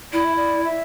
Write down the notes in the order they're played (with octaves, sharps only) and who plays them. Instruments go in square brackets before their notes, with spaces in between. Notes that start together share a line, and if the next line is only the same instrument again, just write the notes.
[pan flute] E4 [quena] D5
[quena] E5
D5
E5